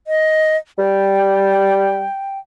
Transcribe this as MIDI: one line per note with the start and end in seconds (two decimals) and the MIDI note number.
0.07 0.57 75
0.79 2.05 55
0.79 2.39 79